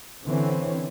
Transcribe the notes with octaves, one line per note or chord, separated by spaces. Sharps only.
D3 E3 C4 C#4